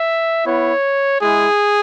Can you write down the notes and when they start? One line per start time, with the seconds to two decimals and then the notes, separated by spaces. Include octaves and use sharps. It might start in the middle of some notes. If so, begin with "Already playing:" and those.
Already playing: E5
0.46 B3 E4 C#5
1.20 G#3 E4 G#4